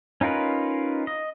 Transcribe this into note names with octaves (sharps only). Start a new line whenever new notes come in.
C#4 D#4 F4 A#4 B4
D#5